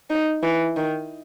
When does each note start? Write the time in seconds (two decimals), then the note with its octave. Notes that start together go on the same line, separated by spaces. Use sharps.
0.10 D#4
0.43 E3
0.76 D#3